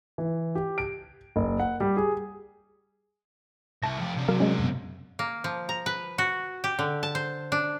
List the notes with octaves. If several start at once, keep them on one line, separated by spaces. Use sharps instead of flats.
E3
G4
D7
F#1
F#5
G3
G#4
C2 E4 A5 A#6
F2 G4
C3 D4
F#3 A#4 F5
G#3 C#4
F#2 B2
A#3
F3
A#5
B4
F#4
G4
D3
A5
C5
D4